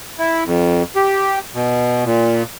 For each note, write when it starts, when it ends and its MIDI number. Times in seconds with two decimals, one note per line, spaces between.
0.19 0.44 64
0.45 0.83 41
0.96 1.39 67
1.54 2.04 47
2.05 2.43 46